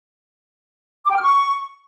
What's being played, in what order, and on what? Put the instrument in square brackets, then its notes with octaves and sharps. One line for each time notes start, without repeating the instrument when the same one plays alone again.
[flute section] D6
G5
F6
C#6